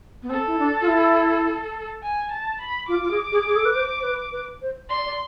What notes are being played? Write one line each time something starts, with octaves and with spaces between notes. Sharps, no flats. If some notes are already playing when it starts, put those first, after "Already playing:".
B3
C4 A4
E4
D4
F4
E4
G#5
A5
B5
F4 D6
F4
G#4
G#4
G#4
A4
B4
C5
C5
B4
B4
C5
D5 C6
D5